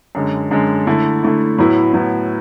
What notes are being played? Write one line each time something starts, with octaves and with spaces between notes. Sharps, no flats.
F#2 D3 G#3
F#2 D3 G#3
D3 A3 E4
D3 A3 E4
A2 F#3 B3 E4
A2 F#3 B3 E4